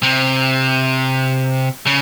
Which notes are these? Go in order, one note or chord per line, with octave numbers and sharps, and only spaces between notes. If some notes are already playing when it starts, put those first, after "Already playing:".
C3
C#3